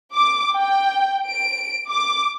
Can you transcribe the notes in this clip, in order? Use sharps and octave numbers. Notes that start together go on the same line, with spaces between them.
D6
G5
D7
D6